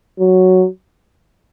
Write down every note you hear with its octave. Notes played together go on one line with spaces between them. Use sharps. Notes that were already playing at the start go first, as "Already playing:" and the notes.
F#3